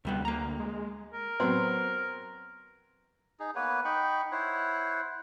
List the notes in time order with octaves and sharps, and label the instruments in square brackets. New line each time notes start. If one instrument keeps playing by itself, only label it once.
[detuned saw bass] D2 [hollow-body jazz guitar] C3 G3 B3
[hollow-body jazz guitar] A#3 A#5
[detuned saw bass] G#3
[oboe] A#4
[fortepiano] F#3 B3 C4
[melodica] D#4 G#4
A#3 B3 B4 C#5
D#4 G5 B5 C#6
E4 C5 C#5 F#5